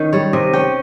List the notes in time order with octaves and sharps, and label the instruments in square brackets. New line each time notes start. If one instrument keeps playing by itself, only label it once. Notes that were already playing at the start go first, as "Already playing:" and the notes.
Already playing: [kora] D#3 C#4
G3 C#5
C3 D#5
C#4 G5